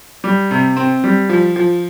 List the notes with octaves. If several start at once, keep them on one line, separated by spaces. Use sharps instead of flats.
G3
C3
C4
G3
F3
F3